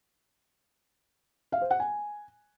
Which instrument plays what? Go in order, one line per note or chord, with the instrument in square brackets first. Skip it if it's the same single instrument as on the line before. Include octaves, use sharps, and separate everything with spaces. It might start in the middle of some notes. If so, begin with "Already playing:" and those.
[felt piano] F5
C5
F#5
G#5